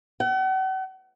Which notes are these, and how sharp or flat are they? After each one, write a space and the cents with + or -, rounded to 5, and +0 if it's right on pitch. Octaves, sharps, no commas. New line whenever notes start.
F#5 +40